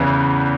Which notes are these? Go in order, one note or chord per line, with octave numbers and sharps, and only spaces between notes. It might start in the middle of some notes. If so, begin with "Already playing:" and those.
Already playing: E2 C#3 E3 B3